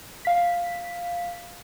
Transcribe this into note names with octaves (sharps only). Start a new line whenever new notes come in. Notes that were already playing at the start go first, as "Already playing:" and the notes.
F5 B6